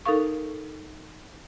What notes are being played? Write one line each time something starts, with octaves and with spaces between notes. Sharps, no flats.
D#4 A4 A#4 F5 C#6